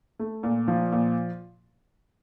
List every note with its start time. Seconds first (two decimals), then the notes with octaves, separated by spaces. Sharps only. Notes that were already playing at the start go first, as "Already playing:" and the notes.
0.19 A3
0.43 A#2
0.68 F3
0.92 A#2